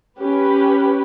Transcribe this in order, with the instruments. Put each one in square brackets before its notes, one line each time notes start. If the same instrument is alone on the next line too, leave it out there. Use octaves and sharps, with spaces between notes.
[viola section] C#4 G4 B4